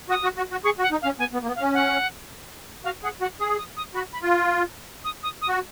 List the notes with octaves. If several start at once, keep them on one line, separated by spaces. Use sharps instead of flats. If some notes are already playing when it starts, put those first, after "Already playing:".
F#4 D#6
F#4
F#4
F#4
G#4 C#6
F#4
F#5
D#4
F5
C#4
B3 G#5
B3
A#3
B3
F5
C#4
F#5
F#4 F5
G#4 F#5
F#4 F#5
G#4 D#6
D#6
D#6
F#4 B5
B5
F4
D#6
D#6
D#6
F#4